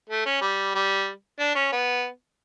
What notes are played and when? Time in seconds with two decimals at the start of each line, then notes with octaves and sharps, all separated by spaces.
0.09 A3
0.26 C#4
0.42 G3
0.75 G3
1.39 D4
1.55 C#4
1.72 B3